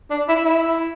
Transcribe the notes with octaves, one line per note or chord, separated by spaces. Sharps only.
D4
E4
E4